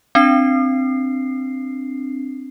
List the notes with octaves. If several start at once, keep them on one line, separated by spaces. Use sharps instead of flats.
C4 D4 C7